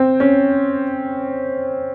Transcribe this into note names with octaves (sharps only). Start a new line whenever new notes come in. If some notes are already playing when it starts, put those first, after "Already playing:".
Already playing: C4
C#4